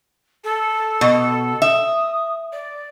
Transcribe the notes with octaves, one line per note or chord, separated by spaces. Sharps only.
A4
B2
E5 D#6
D5